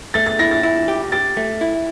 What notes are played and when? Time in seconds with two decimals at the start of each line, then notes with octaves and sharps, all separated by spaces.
0.14 A3 A6
0.26 A6
0.39 E4 A#6
0.51 A6
0.63 E4
0.88 G4
1.12 G4 A6
1.37 A3
1.61 E4